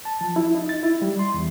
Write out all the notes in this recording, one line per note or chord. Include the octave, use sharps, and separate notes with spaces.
A5
F3
E4
D#4
A6
E4
G3
C6
E2